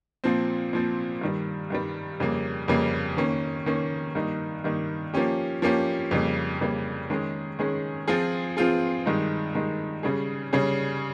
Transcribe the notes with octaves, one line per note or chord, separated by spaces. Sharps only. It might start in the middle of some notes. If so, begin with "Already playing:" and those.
A#2 F3 C4
A#2 F3 C4
G2 D#3 G3
G2 D#3 G3
F2 C#3 G3 A#3
F2 C#3 G3 A#3
D#3 A#3 C#4
D#3 A#3 C#4
G2 D#3 A#3 D#4
G2 D#3 A#3 D#4
F3 A#3 C#4 G4
F3 A#3 C#4 G4
F2 C#3 G3 A#3
F2 C#3 G3 A#3
D#3 G#3 C#4 G#4
D#3 G#3 C#4 G#4
F3 C4 F4 G#4
F3 C4 F4 G#4
G2 D#3 G#3 D#4
G2 D#3 G#3 D#4
C#3 G3 C#4 G#4
C#3 G3 C#4 G#4